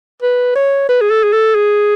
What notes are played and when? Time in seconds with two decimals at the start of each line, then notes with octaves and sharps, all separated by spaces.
0.23 B4
0.56 C#5
0.89 B4
1.01 G#4
1.11 A4
1.23 G#4
1.33 A4
1.55 G#4